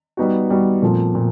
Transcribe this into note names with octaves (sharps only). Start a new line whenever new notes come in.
G3 B3 D#4 F#4
G3 B3 D#4 F#4
A#2 F3 A3 C4
A#2 F3